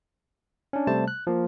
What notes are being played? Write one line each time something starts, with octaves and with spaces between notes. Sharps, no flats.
C#4 D4
C3 G3 A3 C5 A5
F#6
F3 A#3